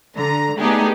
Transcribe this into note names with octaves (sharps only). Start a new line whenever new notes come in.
D3 A#5
A3 B3 D4 D#4 G4 G#4